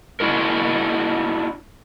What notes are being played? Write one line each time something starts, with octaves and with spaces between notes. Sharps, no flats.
C#4 D4 E4 F#4 A#4